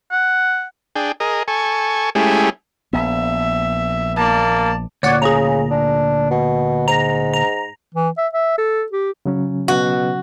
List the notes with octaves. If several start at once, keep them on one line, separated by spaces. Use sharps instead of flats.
F#5
D4 G#4 G5
G#4 A#4 D#5
A4 G#5 C#6
G#3 A3 C#4 E4 G4 G#4
A#1 B3 E5
A#3 D5 A5
D2 A#2 C#5 D5 F#5
C#3 G#4 A#5
D4
B2
G#2 A#5
A#5
E3
E5
E5
A4
G4
C#3 F#3 C#4
B2 F#4